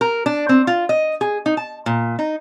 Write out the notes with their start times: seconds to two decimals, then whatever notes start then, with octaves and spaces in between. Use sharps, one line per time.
0.01 A#4
0.26 D4
0.49 C4
0.67 F4
0.89 D#5
1.21 G#4
1.46 D#4
1.57 A5
1.86 A#2
2.19 D#4